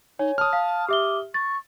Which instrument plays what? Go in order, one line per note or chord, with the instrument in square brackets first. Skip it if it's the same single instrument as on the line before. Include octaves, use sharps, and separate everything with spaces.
[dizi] D#4 [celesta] C#5 [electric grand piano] G#5
[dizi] A5 [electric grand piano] D#6 F6
[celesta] F5
[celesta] G4 E5 G7 [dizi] D6
[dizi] C#6 [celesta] A6